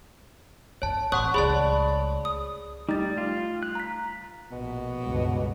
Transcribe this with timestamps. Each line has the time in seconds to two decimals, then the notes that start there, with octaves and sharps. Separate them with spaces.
0.82 G1 D3 C#5 A5
1.12 A1 C#5 F#5 C6 C#6 D#6 F#6
1.34 C#2 A3 G#4 C#5 D5 A5 B5
2.25 D#6
2.89 G3 A3 D#4 A6
3.18 F4
3.63 F#6
3.75 A#5 B6
4.51 A#1 B2
5.01 G1 C#2